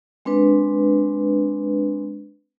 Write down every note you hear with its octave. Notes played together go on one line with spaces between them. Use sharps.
G#3 C4 D4 B4